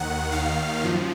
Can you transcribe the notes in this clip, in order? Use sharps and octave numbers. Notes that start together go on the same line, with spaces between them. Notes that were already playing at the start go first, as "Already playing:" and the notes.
Already playing: D#2 D#3 F#5
D#2 D#3 F5
F#2 F3